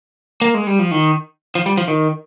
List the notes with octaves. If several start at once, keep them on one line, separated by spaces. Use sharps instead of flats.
A#3
G#3
G3
F3
D#3
F3
G3
F3
D#3